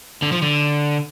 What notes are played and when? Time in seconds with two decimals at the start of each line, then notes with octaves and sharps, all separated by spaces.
0.22 D3
0.32 F3
0.42 D3